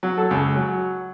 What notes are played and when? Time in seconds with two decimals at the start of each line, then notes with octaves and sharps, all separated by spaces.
0.03 F#3
0.17 A4
0.31 C#2
0.56 F#3